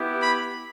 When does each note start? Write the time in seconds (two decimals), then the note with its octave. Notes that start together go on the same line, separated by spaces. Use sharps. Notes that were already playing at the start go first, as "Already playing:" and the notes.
Already playing: B3 E4 G4
0.21 B5